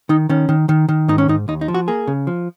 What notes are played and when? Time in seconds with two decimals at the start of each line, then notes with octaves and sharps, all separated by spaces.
0.09 D#3 D#4
0.29 D#3 C#4
0.49 D#3
0.69 D#3
0.89 D#3
1.08 G#2 D#4
1.18 C#4
1.28 G#2 D#4
1.48 D#2 D#4
1.61 D#4
1.68 F3
1.74 F#4
1.88 A#3 G#4
2.07 C#3
2.27 F3